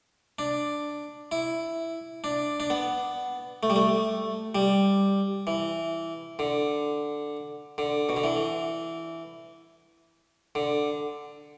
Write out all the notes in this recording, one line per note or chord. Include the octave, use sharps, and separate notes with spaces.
D4
E4
D4
D4
B3
A3
G3
A3
G3
E3
D3
D3
B2
D3
E3
D3